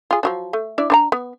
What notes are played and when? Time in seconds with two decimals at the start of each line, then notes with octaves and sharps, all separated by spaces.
0.11 F4 G#4
0.23 F3 F#3 D4
0.53 A3
0.78 D4 E4 D5
0.90 D4 C5 A#5
1.12 B3